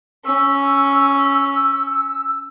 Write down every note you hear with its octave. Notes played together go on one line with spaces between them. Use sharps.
C#4 E6